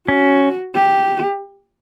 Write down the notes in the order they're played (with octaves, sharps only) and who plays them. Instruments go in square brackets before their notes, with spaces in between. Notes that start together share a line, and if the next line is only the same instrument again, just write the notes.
[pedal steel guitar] C#4 [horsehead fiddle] F#4
[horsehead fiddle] G4